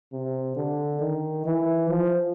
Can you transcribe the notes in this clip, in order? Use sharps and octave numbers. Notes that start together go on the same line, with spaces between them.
C3
D3
D#3
E3
F3